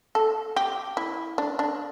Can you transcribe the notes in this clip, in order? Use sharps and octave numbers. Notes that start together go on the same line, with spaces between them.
A4
G4
E4
D4
D4